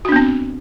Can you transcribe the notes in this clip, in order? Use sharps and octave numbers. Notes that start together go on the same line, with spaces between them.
B3 C4 D4 F#4